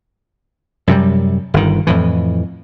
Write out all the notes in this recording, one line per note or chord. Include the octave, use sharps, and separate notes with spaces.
F#2 C3 G3
G1 D#3
F2 A2 E3